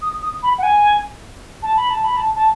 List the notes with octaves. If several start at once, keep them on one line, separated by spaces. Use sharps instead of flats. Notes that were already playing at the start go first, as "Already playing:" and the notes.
D#6
D#6
B5
F#5
G#5
A5
B5
A5
B5
A5
A5